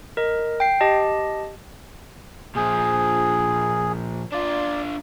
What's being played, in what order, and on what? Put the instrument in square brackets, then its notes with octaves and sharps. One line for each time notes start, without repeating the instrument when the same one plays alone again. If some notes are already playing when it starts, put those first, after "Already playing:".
[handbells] A#4 D#5
G5 C7
G4 D#5 A5
[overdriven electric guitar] A#2 F3 [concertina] G#4
[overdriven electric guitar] D4 F4 [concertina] D5